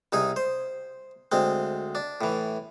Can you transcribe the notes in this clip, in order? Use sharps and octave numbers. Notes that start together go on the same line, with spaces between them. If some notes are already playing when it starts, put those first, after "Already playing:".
C2 D#4 G#4
C5
D2 G#3 C4
D4
A2 E3